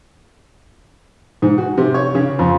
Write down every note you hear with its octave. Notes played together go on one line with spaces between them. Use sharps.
G#2
F#4
C3
C#5
C#3
F2